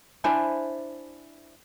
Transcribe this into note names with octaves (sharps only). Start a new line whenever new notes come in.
D4 E4 C5 G#5